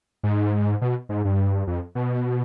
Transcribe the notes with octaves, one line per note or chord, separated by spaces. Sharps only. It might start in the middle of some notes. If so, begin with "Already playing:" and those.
G#2
B2
G#2
G2
F2
B2